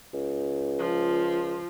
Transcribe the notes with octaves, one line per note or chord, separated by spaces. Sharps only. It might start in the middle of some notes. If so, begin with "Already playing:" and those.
C#2
F3